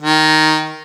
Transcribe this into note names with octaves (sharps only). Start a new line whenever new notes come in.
D#3